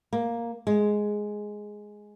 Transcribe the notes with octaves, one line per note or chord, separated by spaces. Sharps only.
A#3
G#3